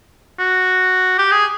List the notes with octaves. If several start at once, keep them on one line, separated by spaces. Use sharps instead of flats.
F#4
G4
G#4